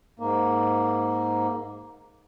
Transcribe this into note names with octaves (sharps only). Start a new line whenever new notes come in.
G#2 A#3